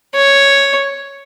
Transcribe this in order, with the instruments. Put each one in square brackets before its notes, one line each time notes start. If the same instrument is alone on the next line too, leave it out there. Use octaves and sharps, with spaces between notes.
[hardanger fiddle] C#5